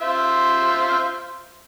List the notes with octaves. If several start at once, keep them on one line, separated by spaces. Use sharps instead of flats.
F4 C5 E5